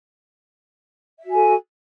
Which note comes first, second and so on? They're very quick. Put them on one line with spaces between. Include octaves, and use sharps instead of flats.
E5 F#4 G#5 A4